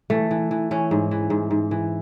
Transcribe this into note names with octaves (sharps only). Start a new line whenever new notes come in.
E3 A3
E3
E3
E3 C#4
G#2
E3
G#2
G#2
E3